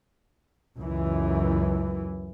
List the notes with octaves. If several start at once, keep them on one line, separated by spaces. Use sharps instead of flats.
C#2 F#2 E3